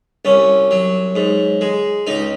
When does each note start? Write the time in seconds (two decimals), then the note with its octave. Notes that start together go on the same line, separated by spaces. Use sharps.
0.25 C2 C#4
0.71 F#3
1.16 G#2
1.61 G#3
2.07 C#2 D#4